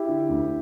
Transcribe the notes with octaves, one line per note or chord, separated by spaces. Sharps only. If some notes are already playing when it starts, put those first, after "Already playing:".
Already playing: E4 G4
D3
D2